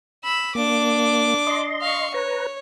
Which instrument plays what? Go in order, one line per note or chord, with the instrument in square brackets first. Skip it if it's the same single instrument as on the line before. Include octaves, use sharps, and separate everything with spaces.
[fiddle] B5 E6
[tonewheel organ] A#3 [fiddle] D4 D6
[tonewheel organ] D#5 C6
[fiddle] F5 C#6
[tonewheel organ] B4 A#5 [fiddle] C#5